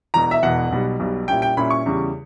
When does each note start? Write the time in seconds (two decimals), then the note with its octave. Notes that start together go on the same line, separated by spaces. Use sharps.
0.14 E1 E2 B2 A#5
0.31 E5
0.43 E1 E2 B2 F#5
0.71 B1 B2 G3
1.00 B1 B2 G3
1.28 A#2 G3 C#4 E4 G5
1.42 G5
1.57 A#2 G3 C#4 E4 B5
1.70 C#6
1.86 E2 C#3 G3